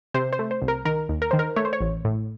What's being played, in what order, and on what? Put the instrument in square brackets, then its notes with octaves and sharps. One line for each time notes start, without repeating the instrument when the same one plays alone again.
[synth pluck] C3 C5
C5
A3
C5
C2
A#4
D#3 A#4
D#2
A#4
D#3 C5
A#4
A3 C#5
C5
C#5
A1
A2